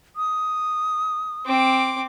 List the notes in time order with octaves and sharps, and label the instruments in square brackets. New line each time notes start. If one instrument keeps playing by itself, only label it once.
[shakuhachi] D#6
[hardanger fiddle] C4 D6